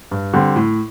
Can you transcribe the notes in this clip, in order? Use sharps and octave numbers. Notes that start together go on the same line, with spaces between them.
G2
D3 G3 C4
A2